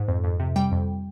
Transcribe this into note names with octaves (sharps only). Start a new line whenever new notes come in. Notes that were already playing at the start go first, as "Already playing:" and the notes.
Already playing: G#2
F2
F2
C3
G3 G5
F2